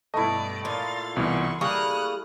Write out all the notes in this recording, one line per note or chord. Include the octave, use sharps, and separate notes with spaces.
G2 B2 A3 E4 D5 D#5
A#2 F5 C6 A6
C2 B2 E3 C6 C#6
G3 A#3 G#4 C#6 D#6 F6 F#6